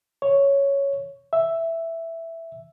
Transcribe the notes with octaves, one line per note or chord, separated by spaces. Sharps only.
C#5
E5